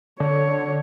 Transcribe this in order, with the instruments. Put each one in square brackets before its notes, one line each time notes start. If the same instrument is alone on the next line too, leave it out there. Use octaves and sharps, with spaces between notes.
[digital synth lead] D3 [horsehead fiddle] C#5